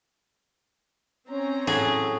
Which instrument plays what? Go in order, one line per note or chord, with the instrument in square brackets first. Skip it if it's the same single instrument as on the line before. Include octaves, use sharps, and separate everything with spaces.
[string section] C4 C#4 A#5
[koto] A2 F#3 G#4